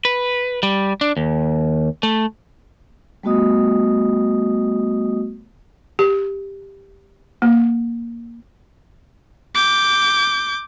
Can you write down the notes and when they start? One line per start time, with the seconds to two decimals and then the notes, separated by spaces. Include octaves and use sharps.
0.05 B4
0.63 G3
1.01 D4
1.17 D#2
2.03 A3
3.23 G3 A3 B3 F#4 D#5 D#6
5.99 G4
7.42 A#3
9.55 D6 G6